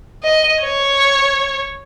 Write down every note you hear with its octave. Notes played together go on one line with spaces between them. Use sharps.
D#5
C#5